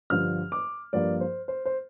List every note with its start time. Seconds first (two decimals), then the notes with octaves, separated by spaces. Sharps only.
0.10 G2 D3 F3 F6
0.52 D6
0.93 G2 F3 A#3 D5
1.21 C5
1.48 C5
1.65 C5